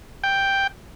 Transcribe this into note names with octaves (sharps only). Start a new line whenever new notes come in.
G5